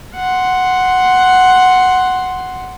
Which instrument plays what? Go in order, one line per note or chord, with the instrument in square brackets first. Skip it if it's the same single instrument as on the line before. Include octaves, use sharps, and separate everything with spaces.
[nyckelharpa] F#5 C6